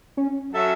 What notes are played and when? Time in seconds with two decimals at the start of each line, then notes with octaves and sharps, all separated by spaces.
0.17 C#4
0.51 F#3 C#4 A4 E5